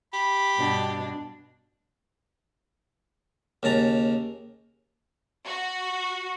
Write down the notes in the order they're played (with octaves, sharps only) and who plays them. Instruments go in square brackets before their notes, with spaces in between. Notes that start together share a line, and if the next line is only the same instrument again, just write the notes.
[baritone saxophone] G4 [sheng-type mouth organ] B5
[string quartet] G2 B2 D4
[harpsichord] D#2 C#3 A5 A#5
[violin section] F#4